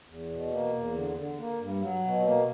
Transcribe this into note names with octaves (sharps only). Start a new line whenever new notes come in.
E2
B2
A#3
E2
D3
D3
A#3
G2
F#3
B2
A#3